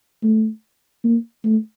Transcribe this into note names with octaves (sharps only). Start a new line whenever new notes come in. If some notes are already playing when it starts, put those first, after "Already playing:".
A3
A#3
A3